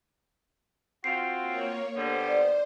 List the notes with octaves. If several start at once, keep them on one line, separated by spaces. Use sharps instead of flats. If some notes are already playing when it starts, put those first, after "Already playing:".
C4 F4 F#4 C7
A#3 C#5
D3 G3 B3 C5
D5